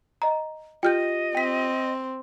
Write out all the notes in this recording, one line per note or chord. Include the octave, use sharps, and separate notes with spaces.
D#5 A#5
F4 G4 D#5 G5 F6 G6
C4 G5 B6